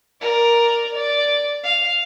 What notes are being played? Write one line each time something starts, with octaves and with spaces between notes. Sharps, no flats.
A#4 D5
D5
F5